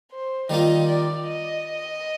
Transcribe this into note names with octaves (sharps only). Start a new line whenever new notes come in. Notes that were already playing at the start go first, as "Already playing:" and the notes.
C5
D#3 G3 A#3 F4 D#5
D5
D#5